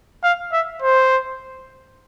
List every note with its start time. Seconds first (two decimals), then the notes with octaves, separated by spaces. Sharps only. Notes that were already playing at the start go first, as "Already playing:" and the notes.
0.24 F5
0.52 E5
0.82 C5